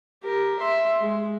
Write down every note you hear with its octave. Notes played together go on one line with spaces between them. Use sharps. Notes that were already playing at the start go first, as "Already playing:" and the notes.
G4 A#4
E5 C6
G#3